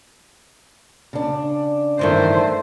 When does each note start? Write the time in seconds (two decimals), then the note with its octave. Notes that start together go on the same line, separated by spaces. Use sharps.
1.13 C#3 D4
1.99 G2 D#3 E3 A3 C5